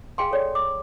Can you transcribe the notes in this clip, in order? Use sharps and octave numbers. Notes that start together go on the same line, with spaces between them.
G#4 F5 G5 G#5 C6
A4 C#5 D5
D6